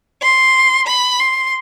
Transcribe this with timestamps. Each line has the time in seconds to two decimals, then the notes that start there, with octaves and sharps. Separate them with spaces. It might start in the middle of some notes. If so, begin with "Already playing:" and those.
0.22 C6
0.87 B5
1.20 C6